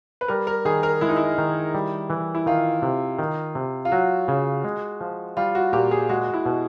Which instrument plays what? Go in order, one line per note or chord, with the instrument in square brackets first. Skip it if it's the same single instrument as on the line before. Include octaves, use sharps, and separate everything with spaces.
[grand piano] B4
[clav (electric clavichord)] G3 [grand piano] A#4
[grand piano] A#4
[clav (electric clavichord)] D#3 [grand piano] G#4
[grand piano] A#4
[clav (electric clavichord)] G#3 [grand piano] E4
[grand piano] D#4
E4
[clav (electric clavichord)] D#3
G3
E3
[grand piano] E4
[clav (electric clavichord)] D#3 [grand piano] F4
[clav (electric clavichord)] C3
D#3
C3
[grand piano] F4
[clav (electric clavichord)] F#3 [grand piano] F#4
[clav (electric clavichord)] C#3
G#3
F3
[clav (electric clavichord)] G3 [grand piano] F4
[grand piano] F#4
[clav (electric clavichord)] A#2 [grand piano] G4
[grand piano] G#4
[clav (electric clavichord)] G#3 [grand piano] F#4
[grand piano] E4
[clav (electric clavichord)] B2